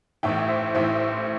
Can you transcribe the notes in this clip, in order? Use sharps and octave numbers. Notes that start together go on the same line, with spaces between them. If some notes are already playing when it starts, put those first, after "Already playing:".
A1 A2 E3 E5 G5
C5 E5
A1 A2 E3 C5 E5